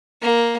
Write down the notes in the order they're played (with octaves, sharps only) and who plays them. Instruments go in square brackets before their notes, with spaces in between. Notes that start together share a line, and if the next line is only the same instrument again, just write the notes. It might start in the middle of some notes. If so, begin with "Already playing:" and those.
[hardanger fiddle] A#3